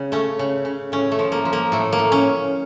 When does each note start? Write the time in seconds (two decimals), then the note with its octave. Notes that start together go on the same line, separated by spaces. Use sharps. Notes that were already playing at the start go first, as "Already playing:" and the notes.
Already playing: C#3
0.12 A3 C#4
0.39 C#3
0.65 C#3
0.92 A2 C#4
1.12 A3
1.19 F3
1.32 A#3
1.45 F3
1.53 A#3
1.72 A2 A3
1.92 A#3
1.99 A2
2.12 C#4